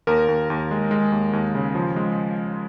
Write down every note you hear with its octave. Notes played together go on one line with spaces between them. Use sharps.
D#2 A#4
D#2
D#2
G#3
G#3
D#2
D#2
C#3
F3
G#3